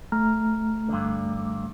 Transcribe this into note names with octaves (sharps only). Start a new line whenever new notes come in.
A3 A#5 F6
G2 D3